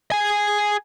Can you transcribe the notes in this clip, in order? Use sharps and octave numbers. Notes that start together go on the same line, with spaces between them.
G#4 G#5